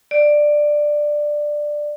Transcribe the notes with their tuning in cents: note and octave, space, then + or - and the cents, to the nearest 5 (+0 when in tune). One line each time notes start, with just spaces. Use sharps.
D5 +10